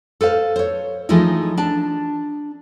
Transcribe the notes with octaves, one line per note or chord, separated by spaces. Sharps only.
A4 B4 C5 F5
C5 C#5
E3 F3 G#3 A3 D#4 E4
D4 A5